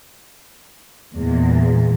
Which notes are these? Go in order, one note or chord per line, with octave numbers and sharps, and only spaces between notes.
E2 A#2 G#3